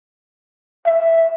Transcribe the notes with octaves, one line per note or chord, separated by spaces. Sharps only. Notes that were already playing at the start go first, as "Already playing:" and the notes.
E5